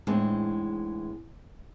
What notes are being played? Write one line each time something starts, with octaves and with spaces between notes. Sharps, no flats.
E2 A2 G#3 C4 D4 D#4